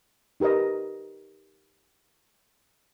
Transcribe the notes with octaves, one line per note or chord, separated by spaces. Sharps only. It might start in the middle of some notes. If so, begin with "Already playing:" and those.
D#4 G4 A#4 B4 D#5